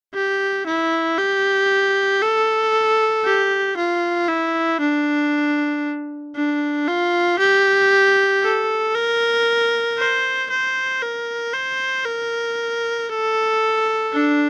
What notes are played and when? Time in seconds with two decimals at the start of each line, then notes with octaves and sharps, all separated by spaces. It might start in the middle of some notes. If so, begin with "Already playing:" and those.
0.14 G4
0.67 E4
1.18 G4
2.22 A4
3.25 G4
3.77 F4
4.29 E4
4.80 D4
6.36 D4
6.88 F4
7.39 G4
8.43 A4
8.95 A#4
9.98 C5
10.50 C5
11.02 A#4
11.53 C5
12.05 A#4
13.10 A4
14.13 D4